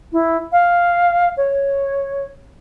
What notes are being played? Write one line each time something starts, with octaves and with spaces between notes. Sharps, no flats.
E4
F5
C#5